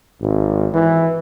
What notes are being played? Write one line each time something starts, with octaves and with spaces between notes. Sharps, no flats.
G#1
E3